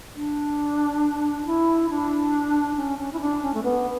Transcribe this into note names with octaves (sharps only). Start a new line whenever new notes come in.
D4
E4
D4
C#4
C#4
E4
D4
C#4
A3
B3